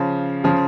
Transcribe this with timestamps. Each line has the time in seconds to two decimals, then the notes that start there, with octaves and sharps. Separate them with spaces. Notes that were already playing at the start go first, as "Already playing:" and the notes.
Already playing: C#3 F3
0.44 C#3 F3